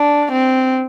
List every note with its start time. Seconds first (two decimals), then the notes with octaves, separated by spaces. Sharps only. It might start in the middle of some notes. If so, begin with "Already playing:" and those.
Already playing: D4
0.32 C4